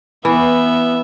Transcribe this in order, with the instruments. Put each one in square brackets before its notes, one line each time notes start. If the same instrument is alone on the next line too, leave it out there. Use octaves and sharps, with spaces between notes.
[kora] E3 [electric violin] B3 E5